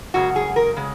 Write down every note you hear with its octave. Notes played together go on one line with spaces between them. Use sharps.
F#2 C#3 G#3 F#4
G#4
A#4
C#3 G#3